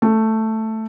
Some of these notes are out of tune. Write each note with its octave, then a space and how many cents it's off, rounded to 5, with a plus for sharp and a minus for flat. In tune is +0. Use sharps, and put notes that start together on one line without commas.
A3 +5